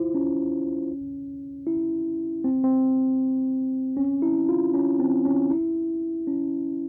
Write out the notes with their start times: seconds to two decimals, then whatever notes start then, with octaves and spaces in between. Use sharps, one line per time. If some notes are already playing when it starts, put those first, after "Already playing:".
Already playing: E4 F4 C5
0.15 C#4
1.67 E4
2.44 C4
2.64 C4
3.97 C#4
4.22 E4
4.49 F4
4.74 C#4
5.00 C4
5.25 C#4
5.51 E4
6.27 C#4